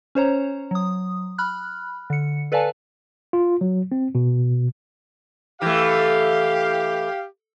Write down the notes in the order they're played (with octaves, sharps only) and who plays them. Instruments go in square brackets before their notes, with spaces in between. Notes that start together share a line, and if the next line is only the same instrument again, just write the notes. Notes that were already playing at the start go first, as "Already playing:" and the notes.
[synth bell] C#4 C5 C#5 A#5
F#3 D#6
B5 F6 F#6
D3 C#7
A4 B4 D5 F5 G#5 A5
[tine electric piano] F4
F#3
C4
B2
[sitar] E3 A3 [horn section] G4 F5